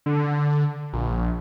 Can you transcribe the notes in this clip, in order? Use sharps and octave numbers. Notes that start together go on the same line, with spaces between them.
D3
A#1